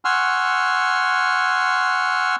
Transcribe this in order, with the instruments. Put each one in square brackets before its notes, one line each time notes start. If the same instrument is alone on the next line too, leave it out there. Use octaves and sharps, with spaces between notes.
[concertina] F#5 G#5 C6 C#6 E6 F6